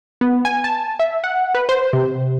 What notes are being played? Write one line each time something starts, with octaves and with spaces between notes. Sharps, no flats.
B3
G#5
A5
E5
F#5
B4
C5
C3